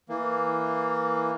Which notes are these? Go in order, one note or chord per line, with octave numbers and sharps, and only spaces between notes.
E3 A#3